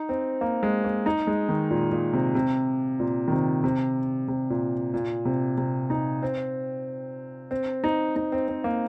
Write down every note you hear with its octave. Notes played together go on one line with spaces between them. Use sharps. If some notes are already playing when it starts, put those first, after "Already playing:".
Already playing: D#4
C4
A#3
G#3
A#3
D#4
G#3
D#3
A#2
A#2
C3
C3
A#2
D#3
C3
C3
C3
A#2
A#2
C3
C3
D#4
C4
C4
D#4
D#4
C4
C4
A#3